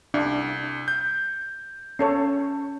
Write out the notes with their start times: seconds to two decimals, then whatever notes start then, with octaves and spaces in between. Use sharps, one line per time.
0.14 C2 D4
0.88 G6
1.99 C#4 A4 C#5